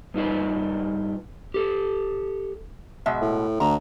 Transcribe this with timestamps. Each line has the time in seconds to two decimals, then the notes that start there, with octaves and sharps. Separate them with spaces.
0.14 G2 D#4 F4 B4
1.54 G4 A4
3.06 B2 G#3 E5
3.21 A2
3.60 D2 A#5